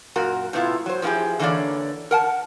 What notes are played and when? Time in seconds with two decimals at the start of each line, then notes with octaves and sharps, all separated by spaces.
0.16 F#2 A#2 F#4 A#4
0.53 A2 C3 B3 E4 F4
0.86 F#3 C5
1.02 F3 G#3 B3 E4 G4 G#4
1.40 D3 E3 A#3 G#4 C#5 D5
2.11 A#4 F#5 A5